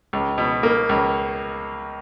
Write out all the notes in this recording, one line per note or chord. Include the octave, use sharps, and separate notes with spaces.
C#2
B2
A#3
C#2